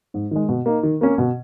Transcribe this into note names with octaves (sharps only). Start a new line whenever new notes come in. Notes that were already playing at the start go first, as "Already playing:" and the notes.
G#2
D#3 G#3
B2
A#3 D#4
D#3
A#3 C#4
B2